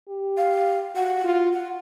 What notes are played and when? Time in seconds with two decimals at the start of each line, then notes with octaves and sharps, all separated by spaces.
0.09 G4
0.37 F5
0.96 F#4 F#5
1.25 F4
1.53 F#5